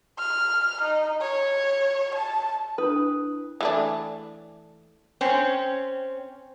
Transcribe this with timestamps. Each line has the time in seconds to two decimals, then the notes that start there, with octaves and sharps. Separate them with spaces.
0.19 F6
0.82 D#4
1.21 C#5
2.15 A5
2.78 D4 E4 B4 D#6
3.61 E3 A3 D4
5.21 C4 C#4